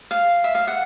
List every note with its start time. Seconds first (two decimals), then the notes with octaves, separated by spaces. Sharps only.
0.11 F5
0.44 E5
0.55 F5
0.68 F#5